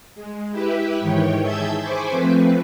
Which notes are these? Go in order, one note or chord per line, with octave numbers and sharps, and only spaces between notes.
G#3
E4 G4 B4 E5
G#2 D#3 E3 C#5 G5
G#4 E5 A5 E6 G6 G#6
C5 G#5 B5 C#6 D6
F3 A3 C4 B4